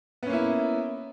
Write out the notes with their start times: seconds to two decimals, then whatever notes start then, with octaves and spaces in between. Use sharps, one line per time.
0.23 B3
0.26 C#4
0.29 A#3
0.33 E4